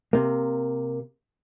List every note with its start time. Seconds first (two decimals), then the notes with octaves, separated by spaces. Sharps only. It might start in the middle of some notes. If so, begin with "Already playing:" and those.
0.13 C3 A#3